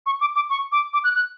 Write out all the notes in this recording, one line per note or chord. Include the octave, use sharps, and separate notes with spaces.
C#6
D6
D6
C#6
D6
D6
F#6
F#6